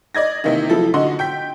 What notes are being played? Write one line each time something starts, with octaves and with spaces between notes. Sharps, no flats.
D5 D#5 G#6 A#6
C3 D#3 E3 A#3 D#4
F3 F#3 E4 A4
D3 D#4 F#4 D#5 C6
G5 G6 B6